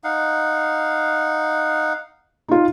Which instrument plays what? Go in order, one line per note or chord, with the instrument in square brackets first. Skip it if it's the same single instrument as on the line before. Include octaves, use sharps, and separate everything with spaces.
[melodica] D#4 F5 F#5
[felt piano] D#4 F4